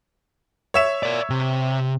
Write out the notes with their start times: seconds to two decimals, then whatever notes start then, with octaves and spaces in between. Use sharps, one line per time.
0.74 C#5 E5 E7
1.03 A#4 D5
1.30 C3